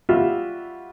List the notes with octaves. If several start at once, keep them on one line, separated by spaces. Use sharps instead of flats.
G3 F4 F#4 E5